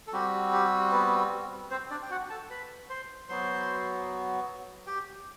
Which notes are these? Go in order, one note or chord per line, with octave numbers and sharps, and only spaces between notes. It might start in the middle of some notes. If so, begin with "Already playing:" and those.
A4
G3 C4 F#4 G4
G4
B3 B4
C4 C5
D4 D5
G5
F#4 F#5
A4 A5
B4 B5
C5 C6
F#3 B3 F#4 C5 C6
G4 G5